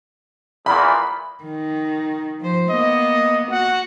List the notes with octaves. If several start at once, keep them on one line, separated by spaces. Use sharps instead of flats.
E2 A#2 B5
D#3
F3 C5
A#3 B3 D#5
F#4 F#5